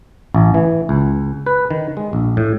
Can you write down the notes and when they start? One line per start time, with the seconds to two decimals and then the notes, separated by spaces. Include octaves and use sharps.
0.35 A1
0.54 E3
0.89 C#2
1.46 B4
1.71 D#3
1.97 G#3
2.13 A#1
2.37 A2